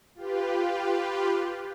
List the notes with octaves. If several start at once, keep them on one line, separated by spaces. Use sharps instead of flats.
F4 G4 B4